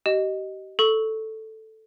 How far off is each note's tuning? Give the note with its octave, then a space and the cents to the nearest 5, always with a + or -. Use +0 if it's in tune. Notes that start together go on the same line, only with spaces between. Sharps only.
G4 -35 D#5 +0
A4 +0 C#6 +0